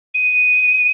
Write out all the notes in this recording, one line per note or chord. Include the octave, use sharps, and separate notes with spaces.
D#7